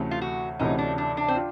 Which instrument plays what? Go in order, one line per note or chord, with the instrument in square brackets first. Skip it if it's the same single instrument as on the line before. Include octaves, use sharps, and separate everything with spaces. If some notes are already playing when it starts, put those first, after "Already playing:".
Already playing: [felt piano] D2 C3 E3 A3 C#4
[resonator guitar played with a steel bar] F4
F#4
[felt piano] D2 C3 E3 A3 C#4 [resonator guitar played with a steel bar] D#4
[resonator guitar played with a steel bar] D4
D4
D4
C4
[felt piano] F4